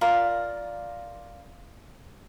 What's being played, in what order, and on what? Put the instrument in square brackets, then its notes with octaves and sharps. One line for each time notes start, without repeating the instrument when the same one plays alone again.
[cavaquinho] F4 A#4 D5